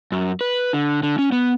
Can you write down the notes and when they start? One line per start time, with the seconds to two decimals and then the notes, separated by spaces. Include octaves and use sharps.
0.12 F#2
0.41 B4
0.73 D3
1.03 D3
1.19 C#4
1.32 B3